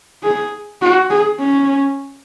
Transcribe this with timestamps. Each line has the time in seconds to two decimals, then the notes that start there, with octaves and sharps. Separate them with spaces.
0.23 G#4
0.81 F#4
1.10 G#4
1.40 C#4